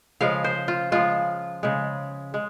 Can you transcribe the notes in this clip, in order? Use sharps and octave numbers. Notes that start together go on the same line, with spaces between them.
C#3 F3 G#3 F5
C5
F4
C#3 F3 G#3 F4
C#3 G#3
G#3